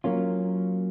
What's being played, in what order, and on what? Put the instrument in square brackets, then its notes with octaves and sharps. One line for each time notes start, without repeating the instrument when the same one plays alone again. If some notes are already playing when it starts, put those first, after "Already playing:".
[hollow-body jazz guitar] F#3 A#3 C#4 F4